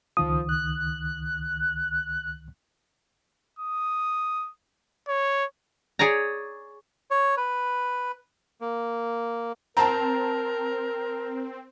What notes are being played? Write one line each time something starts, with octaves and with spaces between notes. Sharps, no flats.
C#2 D#3 F3 D#6
F#6
D#6
C#5
G#4 C#5 D5 A#5
C#5
B4
A#3
C4 A#4 A5 A#5